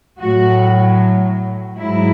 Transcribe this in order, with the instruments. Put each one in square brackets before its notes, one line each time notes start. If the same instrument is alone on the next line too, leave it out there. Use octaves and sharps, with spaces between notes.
[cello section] A2 F#3 F#4
G#2 F#3 E4